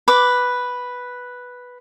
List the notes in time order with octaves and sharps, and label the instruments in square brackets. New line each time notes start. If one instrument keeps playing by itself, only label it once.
[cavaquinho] B4 D6